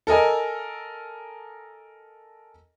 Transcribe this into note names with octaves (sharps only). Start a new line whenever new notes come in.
A4 A#4 D#5 G#5